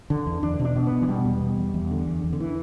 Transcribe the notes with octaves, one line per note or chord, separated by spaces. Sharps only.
D3
E2
E2 D4
B2
D4
B2
B3
B2
E3
B2 G3
E2
B2
E2
E2
D3
E2
E2
D3
E3